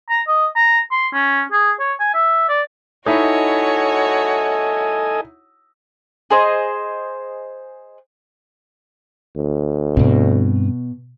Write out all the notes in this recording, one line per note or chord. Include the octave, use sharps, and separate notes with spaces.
A#5
D#5
A#5
C6
C#4
G#4
C#5
G#5
E5
D5
D#4 E4 F#4 A4 C#5 D#5 G#5
G#4 C5 D#5
D2
G2 B2 C4